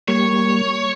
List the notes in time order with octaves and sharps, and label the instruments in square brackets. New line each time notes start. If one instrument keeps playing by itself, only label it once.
[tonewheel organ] G3 A#3 [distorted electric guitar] C#5